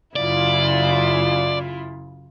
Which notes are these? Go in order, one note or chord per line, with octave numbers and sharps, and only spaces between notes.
F#2 C#3 E4 F4 D5